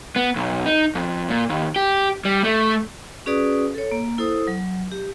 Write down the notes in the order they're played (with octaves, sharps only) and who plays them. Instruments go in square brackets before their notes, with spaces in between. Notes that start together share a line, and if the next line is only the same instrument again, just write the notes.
[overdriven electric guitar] B3
B1
D#4
F2
A#2
D#2
G4
G3
A3
[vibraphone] C#4 F#4 G#4 B4 D5 D#6
A4 C#5
A#3
E4 A4 C5 D#6
F#3
G4